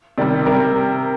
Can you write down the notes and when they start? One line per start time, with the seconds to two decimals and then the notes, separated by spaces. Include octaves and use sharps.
0.18 C3 D#3 G3 D5
0.46 C3 G3 A#4